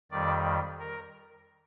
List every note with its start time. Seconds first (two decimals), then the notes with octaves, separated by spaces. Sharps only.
0.11 F2 D#3 G3 D5
0.80 A#4